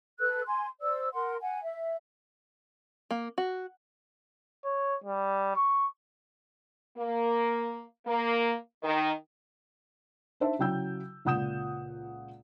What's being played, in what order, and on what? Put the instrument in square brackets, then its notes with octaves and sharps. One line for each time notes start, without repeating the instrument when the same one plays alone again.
[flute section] A4 B4 E6 F#6
G#5 C6
C5 D5 E6
A#4 F#5 C6
F#5 G#5
E5
[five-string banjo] A#3
F#4
[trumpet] C#5
G3
C#6
[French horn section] A#3
A#3
D#3
[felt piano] D4 D#4 C5 E5 A5
C#3 F#3 E4 G5 E6 G6
C#2 A#2 F#5 D#6 G6 E7